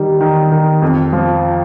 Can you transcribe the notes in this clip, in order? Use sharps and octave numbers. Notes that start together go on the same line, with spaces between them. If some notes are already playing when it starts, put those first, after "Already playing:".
Already playing: D#3 G3
D#3
D#3
F2
F3